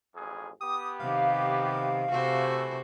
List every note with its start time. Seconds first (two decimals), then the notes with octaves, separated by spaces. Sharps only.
0.14 A1 F2 G#4
0.61 B3 G4 D#6
1.00 C3 D#3 F5
2.11 C3 E3 A3 F#4 C5